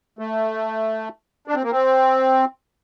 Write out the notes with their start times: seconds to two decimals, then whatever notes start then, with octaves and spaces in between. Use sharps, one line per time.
0.19 A3
1.47 D4
1.55 C4
1.63 A#3
1.71 C4